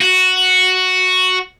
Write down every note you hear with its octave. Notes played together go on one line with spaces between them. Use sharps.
F#4